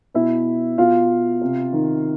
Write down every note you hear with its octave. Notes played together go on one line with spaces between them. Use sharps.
B2 E4 E5
B2 F4 F5
C3
D#3